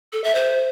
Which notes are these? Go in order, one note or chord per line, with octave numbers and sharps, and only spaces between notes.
A4
E5
C5